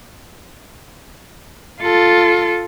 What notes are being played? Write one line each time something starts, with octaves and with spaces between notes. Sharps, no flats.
F4 A4